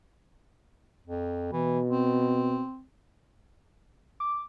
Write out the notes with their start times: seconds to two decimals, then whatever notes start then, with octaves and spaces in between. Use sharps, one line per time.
1.06 F2
1.53 B2 E3
1.90 C4
4.20 D6